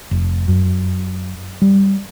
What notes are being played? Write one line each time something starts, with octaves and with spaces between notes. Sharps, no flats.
F1
F#2
G3